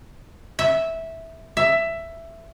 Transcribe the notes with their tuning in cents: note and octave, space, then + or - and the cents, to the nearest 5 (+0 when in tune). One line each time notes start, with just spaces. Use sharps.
E5 -10
E5 +10